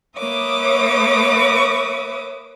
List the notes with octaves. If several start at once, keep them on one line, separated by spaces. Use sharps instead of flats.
A#3 B4 C#5 E5 D6 D#6